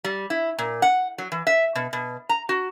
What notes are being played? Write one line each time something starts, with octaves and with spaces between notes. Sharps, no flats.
G3
E4
A#2
F#5
F#3
E3
E5
B2
B2
A#5
F#4